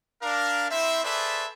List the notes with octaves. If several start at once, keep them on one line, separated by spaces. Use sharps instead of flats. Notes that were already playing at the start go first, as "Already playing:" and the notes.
D4 A#4 F5
C4 E4 C5 E5
G#4 A4 B4 C5 D5 E5